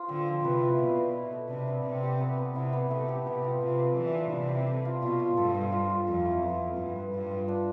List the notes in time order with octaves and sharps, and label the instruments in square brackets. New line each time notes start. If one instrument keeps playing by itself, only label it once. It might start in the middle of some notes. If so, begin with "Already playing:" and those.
Already playing: [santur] F4 C5
[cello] D3 [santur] C4
[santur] F3
[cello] C3 [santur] B4
[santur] E4
[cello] B2 [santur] D5
[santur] B4
E4
A4
[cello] C3 [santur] D4
[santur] B3
[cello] C3 [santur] C4
[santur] G4
B3
B3
[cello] C3 [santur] E4
[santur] B3
[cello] C3 [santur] A3
[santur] G4
[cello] C3 [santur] B3
[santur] F4
[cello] C3 [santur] F5
[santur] B4
[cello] E3 [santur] D5
[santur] D4
[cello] C3 [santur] G3
[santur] E4
A4
F4
[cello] B2 [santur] F4
[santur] F4
[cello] G2 [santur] A4
[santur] C5
F4
F4
[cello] F2 [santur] A4
[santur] E4
[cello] F2 [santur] B3
[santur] B3
[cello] G2 [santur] F5
[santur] B4
[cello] G2 [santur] F4
[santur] F4
D4